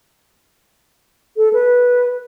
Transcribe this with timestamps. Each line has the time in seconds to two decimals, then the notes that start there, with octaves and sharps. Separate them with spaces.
1.37 A4
1.53 B4